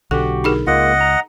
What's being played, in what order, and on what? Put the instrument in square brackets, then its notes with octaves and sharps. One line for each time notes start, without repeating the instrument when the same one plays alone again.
[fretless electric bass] B1 D3 [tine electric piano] F#4 G4 [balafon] A4
[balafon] D#4 G#4 A#4
[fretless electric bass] C#2 [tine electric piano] G#3 A#3 F4 [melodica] D#5 F#5
[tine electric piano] A#5